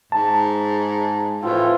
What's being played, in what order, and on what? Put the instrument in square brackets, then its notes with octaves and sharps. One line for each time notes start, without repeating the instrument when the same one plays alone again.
[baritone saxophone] G#2 [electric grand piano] A5
[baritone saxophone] A2 [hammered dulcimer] E3 F3 C4 [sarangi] F4